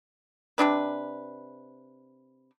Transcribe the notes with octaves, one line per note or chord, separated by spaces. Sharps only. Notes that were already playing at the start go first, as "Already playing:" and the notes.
C3 F#3 D4 B4